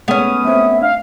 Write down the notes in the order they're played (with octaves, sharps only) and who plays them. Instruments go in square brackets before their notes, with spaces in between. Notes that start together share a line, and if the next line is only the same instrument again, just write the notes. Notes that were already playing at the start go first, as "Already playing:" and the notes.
[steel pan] G#3 A3 A#4 [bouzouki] B3 C#4 [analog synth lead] D#6
[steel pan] A3 C4 [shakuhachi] E5
[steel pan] D4 [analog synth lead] F5